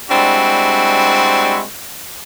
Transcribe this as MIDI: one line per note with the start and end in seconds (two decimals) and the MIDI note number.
0.10 1.62 55
0.10 1.62 56
0.10 1.62 60
0.10 1.62 62
0.10 1.62 64
0.10 1.62 66